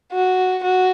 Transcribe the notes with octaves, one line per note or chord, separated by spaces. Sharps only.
F#4
F#4